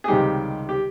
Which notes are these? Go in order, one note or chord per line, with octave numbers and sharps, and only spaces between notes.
G#4
C#2 C3 D#3 G3 G4
G4